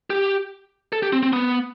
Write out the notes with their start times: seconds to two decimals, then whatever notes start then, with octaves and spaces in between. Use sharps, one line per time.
0.10 G4
0.93 A4
1.03 G4
1.13 C4
1.23 C4
1.33 B3